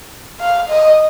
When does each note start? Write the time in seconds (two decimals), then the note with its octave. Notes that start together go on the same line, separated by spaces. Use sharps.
0.40 F5
0.69 D#5